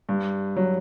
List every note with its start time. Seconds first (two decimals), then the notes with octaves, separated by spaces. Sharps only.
0.09 G2
0.56 F#3